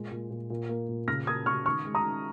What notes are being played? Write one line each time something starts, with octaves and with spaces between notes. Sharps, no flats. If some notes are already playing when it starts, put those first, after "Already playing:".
Already playing: A#2 G#3
A#2
A#2
A#2
A#3
A#2
C#3 F6 A#6
A#3 D#6 G#6
C#3 C#6 F6
D#3 C#6 F6
G#3
A#5 D#6
D#3